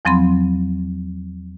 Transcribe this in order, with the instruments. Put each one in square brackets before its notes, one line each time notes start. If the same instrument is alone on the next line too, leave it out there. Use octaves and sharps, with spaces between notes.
[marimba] E2 F3 F#3 C4 B5 C6